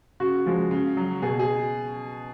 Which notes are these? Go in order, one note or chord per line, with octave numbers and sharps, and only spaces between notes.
C#3 F#4
F3 G#3
C#3
F#3
B2 G#4
G#4